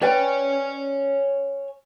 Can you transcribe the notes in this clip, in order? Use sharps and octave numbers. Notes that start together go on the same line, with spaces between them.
B4 C#5 D5 G5 G#5